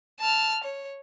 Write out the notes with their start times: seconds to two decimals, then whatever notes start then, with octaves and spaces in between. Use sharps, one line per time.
0.20 A5 F6
0.64 C#5